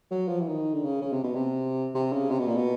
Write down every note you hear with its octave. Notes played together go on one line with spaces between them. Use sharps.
F#3
F3
E3
D#3
D3
C#3
C#3
C3
B2
C3
C3
C#3
C3
B2
A#2
B2